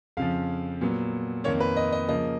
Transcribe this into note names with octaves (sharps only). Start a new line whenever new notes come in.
F2 C#3 F3 F5
A#2 F#3 B3
F2 D#3 A#3 C#5
B4
D#5
D#5
C#3 F3 A#3 D#5